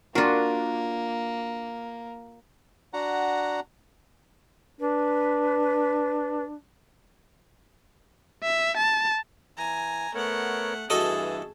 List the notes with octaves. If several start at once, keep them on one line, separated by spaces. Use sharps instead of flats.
A#3 D4 F4 F#4 A#4
D4 F#4 F#5 A#5
D4 B4
E5
A5
E3 G#5 A#5
A3 B3 A#4 C#5 F#5
G2 E3 F#4 G#4 A4 D#5 A5